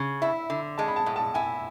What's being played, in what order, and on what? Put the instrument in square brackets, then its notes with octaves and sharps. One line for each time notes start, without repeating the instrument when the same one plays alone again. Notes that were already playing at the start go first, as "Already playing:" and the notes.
Already playing: [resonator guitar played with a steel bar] C#3
[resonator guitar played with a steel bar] E4 [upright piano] E5
[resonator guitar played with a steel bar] D3
[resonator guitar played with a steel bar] G#3 [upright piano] A5
[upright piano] B5
A5
[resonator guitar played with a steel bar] A2
[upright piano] A5
[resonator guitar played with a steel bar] E4 [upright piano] G#5